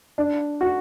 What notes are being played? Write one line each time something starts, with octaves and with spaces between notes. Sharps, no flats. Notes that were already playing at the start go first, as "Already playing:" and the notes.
D4
F#4